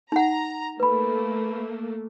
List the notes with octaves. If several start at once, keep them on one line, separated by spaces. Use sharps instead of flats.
D#4 F#5 A#5
A3 A#3 B4 B5